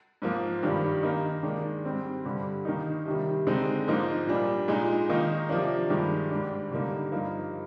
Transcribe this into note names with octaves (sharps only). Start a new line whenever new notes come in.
G#2 F3 A#3
G2 D#3 G3 D4
D#3 A#3 D#4
D#3 G#3 D4
G#2 G3 C4
G2 D3 G3
D#3 A#3 D#4
C3 D#3 G3
D3 G#3 C4 D#4
G#2 F3 A#3 D#4
A#2 G3 D4
A#2 G#3 D#4
D#3 A#3 D#4
C3 F3 A#3 D4
G2 D#3 G#3 D4
G#2 G3 D4
D3 G3 A#3 D#4
G2 F3 A#3 D#4